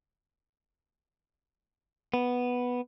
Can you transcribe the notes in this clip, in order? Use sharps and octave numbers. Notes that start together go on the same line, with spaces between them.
B3